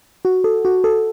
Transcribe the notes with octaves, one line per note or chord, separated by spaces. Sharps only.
F#4
A4
F#4
A4